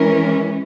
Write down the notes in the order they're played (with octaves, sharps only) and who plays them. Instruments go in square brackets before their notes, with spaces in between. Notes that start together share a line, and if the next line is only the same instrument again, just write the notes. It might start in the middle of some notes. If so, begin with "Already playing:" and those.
Already playing: [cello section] E3 G#3 C#4 A#4